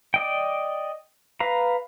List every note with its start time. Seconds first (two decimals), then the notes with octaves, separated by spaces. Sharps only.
0.14 D5 D#5 G5
1.40 B4 F5 A#5